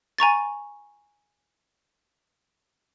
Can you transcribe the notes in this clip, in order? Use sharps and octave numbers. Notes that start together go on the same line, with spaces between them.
G#5 A#5 C#6 A6